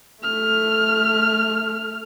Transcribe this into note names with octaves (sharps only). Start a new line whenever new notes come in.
A3 F6